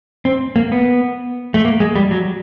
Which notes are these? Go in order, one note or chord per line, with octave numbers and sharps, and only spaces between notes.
C4
A#3
B3
A3
A#3
G#3
G3
F#3